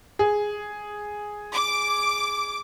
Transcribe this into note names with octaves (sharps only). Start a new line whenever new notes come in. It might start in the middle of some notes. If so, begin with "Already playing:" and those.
G#4
D6